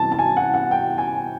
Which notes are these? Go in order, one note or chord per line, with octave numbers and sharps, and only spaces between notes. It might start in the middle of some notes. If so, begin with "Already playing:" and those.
Already playing: C3 E3 G3 A5
A5
G#5
F#5
F#5
G5
G#5